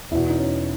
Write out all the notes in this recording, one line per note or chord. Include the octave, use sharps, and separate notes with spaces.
E2 B2 E4
D#4
C#4